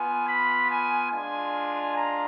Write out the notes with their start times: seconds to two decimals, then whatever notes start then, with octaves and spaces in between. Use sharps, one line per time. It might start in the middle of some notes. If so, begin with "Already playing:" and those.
Already playing: B3 F4 G#5
0.26 B5
0.69 G#5
1.10 G#3 D4 F4 G#5
1.96 A#5